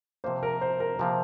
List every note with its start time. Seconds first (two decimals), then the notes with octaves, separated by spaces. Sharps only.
0.24 C3 F3 A#3 C5
0.43 A#4
0.61 C5
0.80 A#4
0.99 C3 F3 A#3